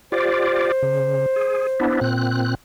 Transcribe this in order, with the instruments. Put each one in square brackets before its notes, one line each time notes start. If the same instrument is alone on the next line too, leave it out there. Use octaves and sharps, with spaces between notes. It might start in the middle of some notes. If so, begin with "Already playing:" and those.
[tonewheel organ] F4 G4 D5 [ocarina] C5
[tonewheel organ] C#3
G#4
B3 D4 E4
A#2 C4 F#6